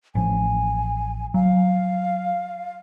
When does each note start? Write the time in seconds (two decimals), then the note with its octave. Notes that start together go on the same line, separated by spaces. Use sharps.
0.15 A1 F3 G#5
1.34 F#3 F5